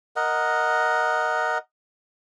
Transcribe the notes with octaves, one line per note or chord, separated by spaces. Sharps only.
A#4 D#5 F#5